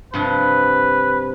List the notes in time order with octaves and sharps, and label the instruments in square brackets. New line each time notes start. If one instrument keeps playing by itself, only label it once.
[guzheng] G2 C3 F3 [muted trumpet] B4